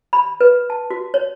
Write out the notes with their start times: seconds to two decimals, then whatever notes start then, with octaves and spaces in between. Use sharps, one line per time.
0.13 B5
0.41 B4
0.70 A5
0.90 F#4
1.14 C#5